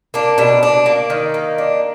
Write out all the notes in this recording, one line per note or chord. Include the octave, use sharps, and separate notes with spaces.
A#3 D4
B2 D4
D4
A#3
D#3
A#3
D4